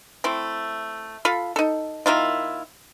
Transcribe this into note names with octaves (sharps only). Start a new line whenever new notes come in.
A3 C4 E4
F4 A4 F5 B5
D#4 A4
D#3 A#3 E4 F4